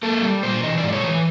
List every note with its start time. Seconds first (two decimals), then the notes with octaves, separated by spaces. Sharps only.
0.03 A#3 A4
0.22 G3
0.43 A#2 C5
0.63 E3 D#5
0.77 D5
0.83 G#2
0.88 D5
0.92 C#5
1.03 E3 B4